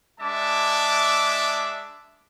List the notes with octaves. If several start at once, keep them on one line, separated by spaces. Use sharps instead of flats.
G#3 D4 E5 A5 D6